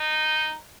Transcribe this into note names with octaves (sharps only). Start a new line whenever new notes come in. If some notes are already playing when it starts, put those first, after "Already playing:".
Already playing: D#4